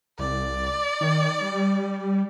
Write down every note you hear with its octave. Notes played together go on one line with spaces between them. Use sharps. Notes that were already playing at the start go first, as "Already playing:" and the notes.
C2 D5
D#3
G3